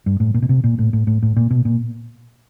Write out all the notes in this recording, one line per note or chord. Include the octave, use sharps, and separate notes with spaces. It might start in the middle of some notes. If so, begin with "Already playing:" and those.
G2
A2
A#2
B2
C3
A#2
A2
A2
A2
A2
A#2
B2
A#2